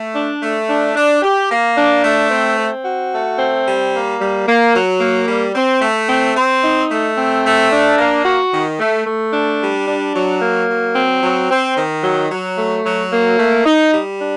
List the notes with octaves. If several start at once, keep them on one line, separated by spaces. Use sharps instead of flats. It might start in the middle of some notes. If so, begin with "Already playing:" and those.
Already playing: A3
D4
A3
D4
D4
G4
A#3
D4
A3
C4
C4
F#4
A3
C4
G3
A#3
G3
A#3
F#3
A#3
G3
C4
A3
C4
C4
D#4
A3
C4
A3
D4
A#3
F#4
D#3
A3
A3
D4
G3
D4
F#3
A#3
F#3
C4
F#3
C4
D#3
F#3
F#3
A3
F#3
A#3
A3
D#4
G3
D4